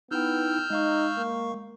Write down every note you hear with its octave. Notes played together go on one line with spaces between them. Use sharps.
B3 D#4 E4 G5 E6 F6 G6
G#3 D#4 F5 C#6
A#3